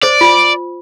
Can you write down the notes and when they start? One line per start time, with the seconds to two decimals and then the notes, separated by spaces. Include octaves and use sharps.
0.03 C5 D5
0.21 F4